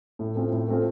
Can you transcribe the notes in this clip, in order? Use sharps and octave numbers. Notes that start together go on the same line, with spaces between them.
A2
A3 C4 F4
A2
A3 C4 F4